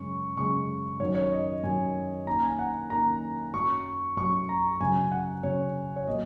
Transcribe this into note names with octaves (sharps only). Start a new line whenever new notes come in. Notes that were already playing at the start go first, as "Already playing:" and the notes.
Already playing: F#2 C#3 G#3 C#4 C#6
F#2 C#3 G#3 C#4 C#6
F#2 D#3 F#3 C#4 C#5
C#5
D#5
F#2 D#3 F#3 C#4 G#5
D#3 A#3 C#4 A#5
G#5
F#5
D#3 A#3 C#4 A#5
F#2 F#3 C#4 C#6
F#2 F#3 C#4 C#6
A#5
F#2 C#3 F#3 G#5
F#5
F#2 C#3 F#3 C#5
C#5
A#2 F#3 A#3 D#5